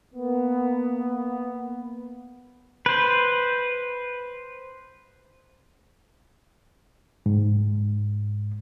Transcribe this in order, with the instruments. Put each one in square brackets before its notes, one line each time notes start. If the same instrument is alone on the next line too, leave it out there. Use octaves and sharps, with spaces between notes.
[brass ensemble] A#3 B3
[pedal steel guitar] B4 C5
[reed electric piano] G#2